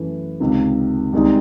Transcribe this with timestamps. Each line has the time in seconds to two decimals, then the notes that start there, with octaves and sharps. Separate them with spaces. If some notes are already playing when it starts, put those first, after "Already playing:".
Already playing: F#2 E3 A3
0.40 C#2 C3 D#3
1.13 C2 C3 D#3 G#3 D#4